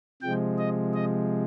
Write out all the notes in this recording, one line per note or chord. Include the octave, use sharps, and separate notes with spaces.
C3 F3 G#3 G5
D#5
D#5